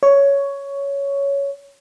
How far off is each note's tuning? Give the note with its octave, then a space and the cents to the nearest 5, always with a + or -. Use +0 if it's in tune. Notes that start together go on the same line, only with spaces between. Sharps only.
C#5 +10